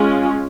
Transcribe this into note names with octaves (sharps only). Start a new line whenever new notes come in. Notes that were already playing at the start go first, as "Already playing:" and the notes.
Already playing: G#3 C#4 F4